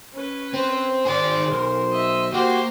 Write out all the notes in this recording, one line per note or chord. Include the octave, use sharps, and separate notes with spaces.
C#4 B4
C4 C5
D#3 G#4 D5
B1 A#4
D#5 E5
A#3 F#4 G4 C5 C6